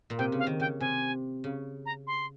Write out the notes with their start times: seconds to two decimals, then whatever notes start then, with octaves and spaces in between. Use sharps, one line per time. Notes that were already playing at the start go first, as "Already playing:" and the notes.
0.10 A#2
0.18 C3 G5
0.32 C#3
0.39 F5
0.47 D#3
0.60 C#3 G5
0.80 C3 G#5
1.44 C#3
1.86 A#5
2.07 C6